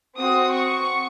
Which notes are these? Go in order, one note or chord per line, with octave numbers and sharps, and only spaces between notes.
C4 F#4 D#6
C#6